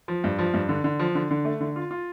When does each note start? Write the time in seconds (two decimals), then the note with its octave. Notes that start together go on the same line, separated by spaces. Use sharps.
0.08 F3
0.24 G2
0.39 F3
0.54 G2
0.69 D3
0.84 D3
0.99 F3
1.15 D3
1.31 D3
1.45 A3
1.61 D3
1.76 F4
1.91 F4